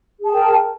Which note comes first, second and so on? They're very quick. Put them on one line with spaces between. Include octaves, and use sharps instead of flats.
G#4 A5 G5 A#4